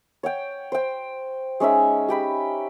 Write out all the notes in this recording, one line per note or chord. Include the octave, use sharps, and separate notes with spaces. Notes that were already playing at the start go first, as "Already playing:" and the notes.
C#5 F#5 G5
C5 G5
G#3 C#4 D#4 E5
G4 G5 B5